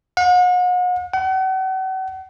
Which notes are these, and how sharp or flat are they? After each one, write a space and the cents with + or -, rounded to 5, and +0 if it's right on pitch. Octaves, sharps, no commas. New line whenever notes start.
F#5 -40
F#5 +40